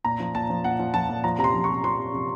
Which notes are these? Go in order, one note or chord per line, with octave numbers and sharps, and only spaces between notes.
A#2 A#5
F3
A#2 A5
F3
A#2 F#5
F3
F3 A5
A#2
F3 A#5
C3 A#5
C6
F3
C#6
C3
F3 C6
C3
C3